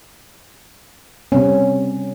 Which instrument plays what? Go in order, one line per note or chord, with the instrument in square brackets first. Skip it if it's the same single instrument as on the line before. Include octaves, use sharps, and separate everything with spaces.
[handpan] C3 G3 C4 C#4